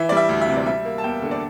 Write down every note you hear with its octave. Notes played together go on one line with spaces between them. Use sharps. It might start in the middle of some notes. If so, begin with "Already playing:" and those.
Already playing: E3 E5
G3 D5
E5
D2
E5
C3
D5
G3 E5
A#3
A5
E2 G5
D3
D5